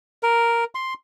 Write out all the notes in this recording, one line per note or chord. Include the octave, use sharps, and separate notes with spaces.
A#4
C6